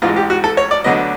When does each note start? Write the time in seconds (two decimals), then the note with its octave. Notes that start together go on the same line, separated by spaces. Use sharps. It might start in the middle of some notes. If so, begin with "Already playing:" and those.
0.02 A1 G#2 E3 G#3 F4
0.16 G4
0.30 F#4
0.44 A4
0.57 C#5
0.71 D5
0.84 D2 D3 F#3 B3 D#5